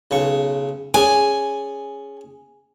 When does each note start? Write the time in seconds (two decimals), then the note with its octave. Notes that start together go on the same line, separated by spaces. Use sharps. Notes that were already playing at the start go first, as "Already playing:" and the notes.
0.11 B1 C#3 C#6
0.94 C#4 G#4 D5 G#5